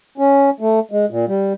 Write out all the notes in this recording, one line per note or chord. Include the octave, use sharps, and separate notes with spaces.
C#4
A3
G#3
A#2
G3